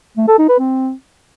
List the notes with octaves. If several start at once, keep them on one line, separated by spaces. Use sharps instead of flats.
A3
A4
D#4
B4
C4